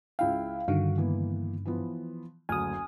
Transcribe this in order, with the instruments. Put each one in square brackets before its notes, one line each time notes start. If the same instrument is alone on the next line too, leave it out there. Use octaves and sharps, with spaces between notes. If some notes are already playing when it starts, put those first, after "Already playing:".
[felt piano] C#2 E4 G5 [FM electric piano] F5
[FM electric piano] G2 D3 D#3 [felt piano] F#4 F5
[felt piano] E3 A#3 B3
E3 F3 B3
[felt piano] F#1 D2 F6 [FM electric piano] G#5 D#6